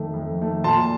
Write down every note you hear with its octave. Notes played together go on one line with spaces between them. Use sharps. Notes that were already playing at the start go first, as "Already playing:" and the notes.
Already playing: F2 D#3 A3
F2
D#3 A3
A#2 A5 C6